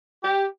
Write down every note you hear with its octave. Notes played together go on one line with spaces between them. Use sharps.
G4